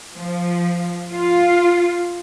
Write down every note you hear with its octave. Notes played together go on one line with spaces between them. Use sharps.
F3
F4